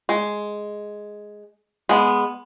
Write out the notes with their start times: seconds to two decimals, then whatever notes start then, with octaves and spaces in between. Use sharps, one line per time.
0.09 G#3
1.89 G#3 B3